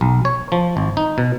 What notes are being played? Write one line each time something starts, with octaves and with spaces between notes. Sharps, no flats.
B1
C#5
F3
G#1
D#4
B2